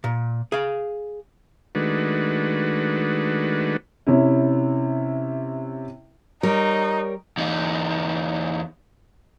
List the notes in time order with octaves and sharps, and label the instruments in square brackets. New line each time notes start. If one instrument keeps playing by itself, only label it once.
[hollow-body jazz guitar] A#2
G#4 F5
[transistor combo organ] D#3 G#3 A3 D4 F#4 B4
[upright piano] C3 C#4 E4
[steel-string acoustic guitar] G3 A#4 C#5 [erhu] D#4
[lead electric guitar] E2 D#4